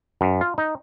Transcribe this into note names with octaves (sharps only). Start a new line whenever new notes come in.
F#2
F4
D#4